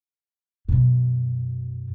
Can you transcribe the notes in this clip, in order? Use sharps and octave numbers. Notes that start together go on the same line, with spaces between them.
F#2 B2